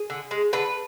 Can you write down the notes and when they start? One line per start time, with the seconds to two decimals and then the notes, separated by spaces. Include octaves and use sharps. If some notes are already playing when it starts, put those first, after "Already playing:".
Already playing: G#4
0.10 D3
0.31 G#3
0.53 D3 B4